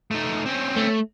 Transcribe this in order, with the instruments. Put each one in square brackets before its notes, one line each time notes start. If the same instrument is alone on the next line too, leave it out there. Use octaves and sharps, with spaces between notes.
[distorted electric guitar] A3 D#4
C4 C#4
[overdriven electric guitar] A3